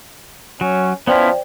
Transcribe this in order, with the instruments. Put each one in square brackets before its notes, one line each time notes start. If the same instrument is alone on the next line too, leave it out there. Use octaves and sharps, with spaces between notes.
[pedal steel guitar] F#3 [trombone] C#4
[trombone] F3 [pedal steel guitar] B3 C#4 E4 [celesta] C5 D5 G5